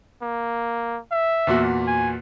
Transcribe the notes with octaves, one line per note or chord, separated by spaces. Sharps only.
A#3
E5
E2 A#2 F#4
G#5